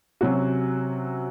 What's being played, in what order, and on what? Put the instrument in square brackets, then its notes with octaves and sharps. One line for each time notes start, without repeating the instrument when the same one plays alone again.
[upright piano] C3 F#3 C#4 F#4